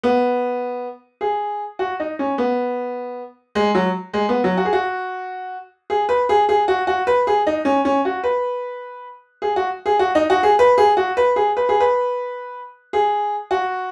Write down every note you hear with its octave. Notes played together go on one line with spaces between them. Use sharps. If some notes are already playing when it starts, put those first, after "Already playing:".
B3
G#4
F#4
D#4
C#4
B3
G#3
F#3
G#3
B3
F#3
F#4
G#4
F#4
G#4
B4
G#4
G#4
F#4
F#4
B4
G#4
D#4
C#4
C#4
F#4
B4
G#4
F#4
G#4
F#4
D#4
F#4
G#4
B4
G#4
F#4
B4
G#4
B4
G#4
B4
G#4
F#4